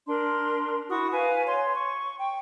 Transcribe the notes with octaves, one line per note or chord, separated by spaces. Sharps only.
D4 A#4 C6
E4 F#4 C#6 D#6
B4 F5 G#5
C#5 C6
C#6
G5